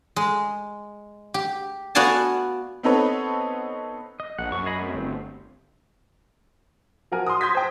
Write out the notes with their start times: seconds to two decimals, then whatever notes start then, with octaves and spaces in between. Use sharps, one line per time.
0.16 G#3
1.34 G4
1.95 B3 F#4 D5 F5 G#5 A5
2.83 B3 C4 D#4 A4 B4 C#5
4.20 D#5
4.38 A#1 F#5
4.52 F#2 C#6
4.66 G#4 D#5 B5
4.81 A3 C4
4.95 G1
7.12 F3 F#4 A#4 G#5
7.26 C6 D#6
7.41 C6 D#6 G6 G#6 A#6 B6
7.55 C5 G5